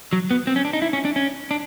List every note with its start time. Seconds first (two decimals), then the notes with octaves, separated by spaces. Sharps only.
0.13 F#3
0.31 B3
0.47 C4
0.56 C#4
0.65 D4
0.73 D#4
0.82 E4
0.93 C#4
1.05 D4
1.16 C#4
1.51 D4